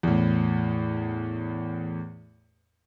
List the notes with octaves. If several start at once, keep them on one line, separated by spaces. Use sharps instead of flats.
E2 A2